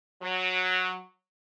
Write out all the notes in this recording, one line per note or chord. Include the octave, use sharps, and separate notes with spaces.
F#3